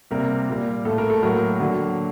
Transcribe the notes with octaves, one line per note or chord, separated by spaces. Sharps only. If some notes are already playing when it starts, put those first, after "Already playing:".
C3 G3 A#3 A#4
A#2 G3 A#3
A2 A3 A4
A#4
A4
A2 F#3 A#3 A#4
D3 F#3 A#3